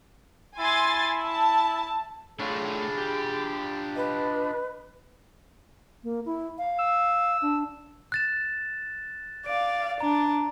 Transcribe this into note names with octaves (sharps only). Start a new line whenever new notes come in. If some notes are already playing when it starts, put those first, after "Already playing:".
E4 G#5 C6 A6
A5
A3 D4 F4 G#4 C#5 B5
G4
B4 D#5
A#3
E4
F5
E6
D4
F#6 A6 E7
D5 F5 D7
D4 A#5